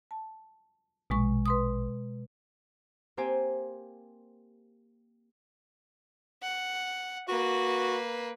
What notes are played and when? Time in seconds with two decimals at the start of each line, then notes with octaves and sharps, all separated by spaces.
0.11 A5
1.10 A#1 B2 G#3 C#6
1.46 B4 C6 D#6
3.17 A#3 C4 G4 C5 G5 G#5
6.42 F#5
7.28 A#3 F#4 B4